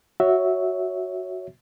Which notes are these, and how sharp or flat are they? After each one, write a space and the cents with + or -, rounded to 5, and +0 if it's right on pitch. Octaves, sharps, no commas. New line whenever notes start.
F#4 +0 C#5 +5 E5 -10